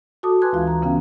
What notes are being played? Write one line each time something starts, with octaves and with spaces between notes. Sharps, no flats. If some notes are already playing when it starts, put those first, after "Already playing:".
F#4 A4 A5 D6 D#6
B4 G#5 A5 C6 F#6 G#6
D2 E3 G#3 F4 F5
F5 A#5
C#3 E3 B3 C#4 F5 G5